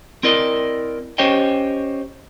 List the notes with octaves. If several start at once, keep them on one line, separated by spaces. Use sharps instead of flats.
C4 E4 A#4 D5 D#5
C#4 G4 C5 C#5 D#5 G5